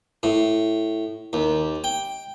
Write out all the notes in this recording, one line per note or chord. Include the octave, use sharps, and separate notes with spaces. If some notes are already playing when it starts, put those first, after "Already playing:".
A2
D#2
G5